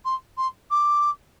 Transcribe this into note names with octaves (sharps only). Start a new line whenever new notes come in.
C6
C6
D6